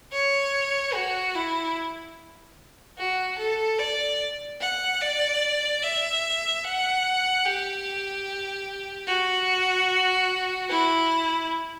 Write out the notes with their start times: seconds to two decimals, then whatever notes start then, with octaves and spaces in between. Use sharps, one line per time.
0.13 C#5
0.94 F#4
1.35 E4
2.98 F#4
3.38 A4
3.79 D5
4.60 F#5
5.01 D5
5.82 E5
6.64 F#5
7.45 G4
9.07 F#4
10.70 E4